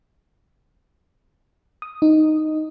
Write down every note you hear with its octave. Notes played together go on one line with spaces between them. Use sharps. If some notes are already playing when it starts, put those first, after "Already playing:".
D#6
D#4